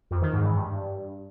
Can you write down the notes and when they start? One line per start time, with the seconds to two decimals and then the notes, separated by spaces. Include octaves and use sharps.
0.11 F2
0.22 D#3
0.33 G#2
0.44 E3
0.56 G2